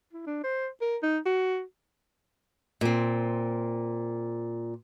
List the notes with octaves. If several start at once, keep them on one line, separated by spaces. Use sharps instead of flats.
E4
D4
C5
A#4
D#4
F#4
A#2 C4